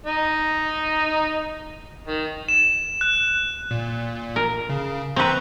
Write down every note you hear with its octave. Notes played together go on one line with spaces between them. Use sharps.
D#4 D#5
D#3
E7
F#6
A#2
A#4
C#3
C4 B4 A#5 C6 C#6